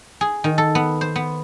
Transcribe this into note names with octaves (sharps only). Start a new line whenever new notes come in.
G#4
D#3
A4
B3
C5
B3